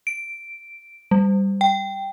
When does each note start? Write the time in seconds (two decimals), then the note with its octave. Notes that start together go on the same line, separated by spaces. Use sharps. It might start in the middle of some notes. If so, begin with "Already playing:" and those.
0.07 D7
1.11 G3
1.61 G5